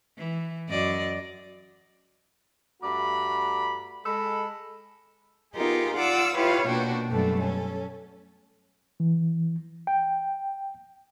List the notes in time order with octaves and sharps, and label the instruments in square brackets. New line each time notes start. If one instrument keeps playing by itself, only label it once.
[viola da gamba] E3
F#2 D5 D#5
[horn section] G2 A3 F#4 D5 A#5 B5
G#3 A4 B5
[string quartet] B3 D#4 F4 G4 G#4 A#4
F4 D5 F5 F#5 D6 E6
E4 F4 G4 B4 C#5 F5
B2 A#3 D4 F#4 G5
F#2 B2 G3 A3 D4 A4
C#4 A4
[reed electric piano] E3
G5